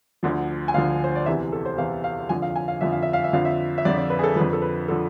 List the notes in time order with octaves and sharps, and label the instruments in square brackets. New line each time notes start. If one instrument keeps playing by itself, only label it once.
[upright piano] D2 D3 F3
G#5
D2 D3 F3 F5
C5
D5
E2 C3 E3 E5
A4
C5
E2 C3 E3 F5
F5
F2 D3 F3 G#5
F5
G#5
F5
F2 D3 F3 E5
F5
E5
F5
E5
F2 D3 F3 F5
E5
E5
F2 D3 F3 D5
D5
B4
G#4
A4
F2 D3 F3 B4
A4
B4
D3 F3 A4